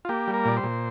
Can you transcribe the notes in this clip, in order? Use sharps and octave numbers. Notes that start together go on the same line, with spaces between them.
F4
A#3 G4
G3
A#4
A#2 D5
C5
A#2